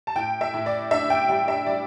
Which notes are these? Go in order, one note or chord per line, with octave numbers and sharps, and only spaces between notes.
A5
A2 G5
E5
A2
D5
D4 E5
G5
G3 G5
E5
G3 D5